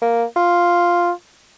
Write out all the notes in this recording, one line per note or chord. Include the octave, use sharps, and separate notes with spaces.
A#3
F4